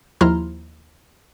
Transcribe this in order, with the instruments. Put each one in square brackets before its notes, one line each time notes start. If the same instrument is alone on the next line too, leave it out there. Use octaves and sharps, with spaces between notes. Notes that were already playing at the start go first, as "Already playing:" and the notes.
[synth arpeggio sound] D#2 F3 E4 A#5 C6 F6